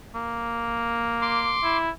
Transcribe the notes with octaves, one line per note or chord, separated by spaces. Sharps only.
A#3
C6 D6
E4